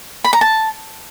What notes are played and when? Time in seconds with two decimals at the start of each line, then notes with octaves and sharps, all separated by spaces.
0.24 B5
0.33 A#5
0.41 A5